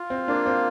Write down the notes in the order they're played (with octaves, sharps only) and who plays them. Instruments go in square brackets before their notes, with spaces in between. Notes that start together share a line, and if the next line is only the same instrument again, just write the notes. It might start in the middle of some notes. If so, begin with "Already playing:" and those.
Already playing: [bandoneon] F4
[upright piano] C4
[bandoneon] A#3 [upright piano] D4
[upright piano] C4